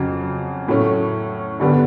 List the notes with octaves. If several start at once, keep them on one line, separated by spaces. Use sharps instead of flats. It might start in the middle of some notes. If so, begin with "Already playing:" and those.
Already playing: F2 C#3 F#3
A2 F#3 A3 C#4
G2 D3 G3 B3